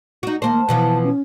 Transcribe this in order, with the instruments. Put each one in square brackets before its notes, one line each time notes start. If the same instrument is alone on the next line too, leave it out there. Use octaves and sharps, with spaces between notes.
[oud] D#4 F#4
[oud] D#2 A#3 C5 [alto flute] A5
[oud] B2 E3 F3
[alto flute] C#4